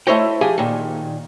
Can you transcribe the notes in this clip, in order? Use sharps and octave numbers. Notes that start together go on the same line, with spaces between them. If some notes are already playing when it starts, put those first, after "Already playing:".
A3 E4 C5 C#5 D#5 G5
F3 G4 G#4 G#5
A#2 D#3